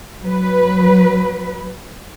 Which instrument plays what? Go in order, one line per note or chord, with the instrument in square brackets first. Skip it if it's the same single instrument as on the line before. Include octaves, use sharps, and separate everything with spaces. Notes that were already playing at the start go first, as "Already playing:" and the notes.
[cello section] F#3 B4